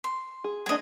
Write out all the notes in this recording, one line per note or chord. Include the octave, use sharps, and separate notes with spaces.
C6
G#4
F#3 A#3 D4 G#4 D#5